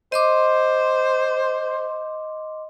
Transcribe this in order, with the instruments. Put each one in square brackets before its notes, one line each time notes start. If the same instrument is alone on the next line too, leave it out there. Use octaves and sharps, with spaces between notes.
[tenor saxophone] C5 [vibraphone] D#5 C6 D6